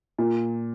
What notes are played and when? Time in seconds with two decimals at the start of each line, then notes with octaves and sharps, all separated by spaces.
0.18 A#2